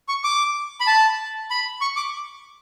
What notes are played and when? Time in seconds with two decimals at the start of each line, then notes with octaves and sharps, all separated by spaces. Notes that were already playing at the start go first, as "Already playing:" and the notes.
0.09 C#6
0.24 D6
0.80 B5
0.87 A5
1.50 B5
1.81 C#6
1.96 D6